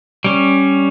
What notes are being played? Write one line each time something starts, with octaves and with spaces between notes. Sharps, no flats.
G3 C#4